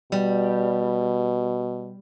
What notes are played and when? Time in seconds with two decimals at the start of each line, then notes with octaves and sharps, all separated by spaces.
0.12 B2 G3